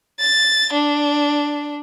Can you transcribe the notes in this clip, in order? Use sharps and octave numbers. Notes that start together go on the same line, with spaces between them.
A6
D4